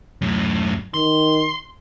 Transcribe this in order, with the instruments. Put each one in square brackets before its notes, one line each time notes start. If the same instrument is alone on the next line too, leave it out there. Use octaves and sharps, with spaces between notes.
[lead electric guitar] F#2 A2
[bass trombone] D#3 [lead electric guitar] C6